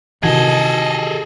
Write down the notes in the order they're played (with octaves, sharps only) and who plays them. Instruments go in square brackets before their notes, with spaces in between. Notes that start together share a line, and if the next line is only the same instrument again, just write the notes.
[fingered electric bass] C3 E3 [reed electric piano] D#3 F#4 G#6 [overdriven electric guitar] G#4 A4 [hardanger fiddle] D#5